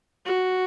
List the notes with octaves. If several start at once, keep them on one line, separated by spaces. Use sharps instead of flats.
F#4